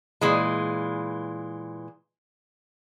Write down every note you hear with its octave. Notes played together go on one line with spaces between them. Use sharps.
A#2 E3 G#3